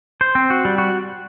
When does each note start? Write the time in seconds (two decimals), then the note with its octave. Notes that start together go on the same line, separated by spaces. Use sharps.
0.21 C5
0.35 C4
0.50 F#4
0.65 G3
0.78 F#4